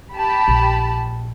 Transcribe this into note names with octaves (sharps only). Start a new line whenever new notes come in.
G4 A5 B5
A#1